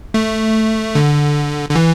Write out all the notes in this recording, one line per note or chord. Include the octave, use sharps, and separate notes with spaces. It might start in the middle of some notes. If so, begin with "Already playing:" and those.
A3
D3
D3
E3